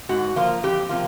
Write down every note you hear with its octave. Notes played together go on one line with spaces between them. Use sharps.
G#2 F#4
F3 A#3 F4
F2 G4
C3 F3 A#3 F4